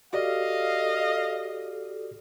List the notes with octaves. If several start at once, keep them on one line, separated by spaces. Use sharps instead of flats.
F#4 G4 A4 D5 D#5 F5